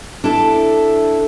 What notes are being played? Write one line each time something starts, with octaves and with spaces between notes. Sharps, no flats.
D4 E4 A4